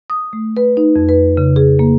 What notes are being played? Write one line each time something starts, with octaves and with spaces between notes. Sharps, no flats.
D#6
A3
B4
D#4
F2
B4
C#3
G#4
A#3